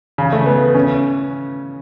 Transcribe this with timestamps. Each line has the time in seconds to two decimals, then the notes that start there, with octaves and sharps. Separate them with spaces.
0.18 C#3
0.33 A3
0.46 B3
0.74 C#4